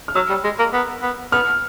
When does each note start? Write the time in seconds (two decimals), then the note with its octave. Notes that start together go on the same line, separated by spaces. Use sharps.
0.08 F6
0.15 F#3 E6
0.29 G3
0.44 G#3
0.59 A#3
0.73 B3
1.02 B3
1.32 B3 F6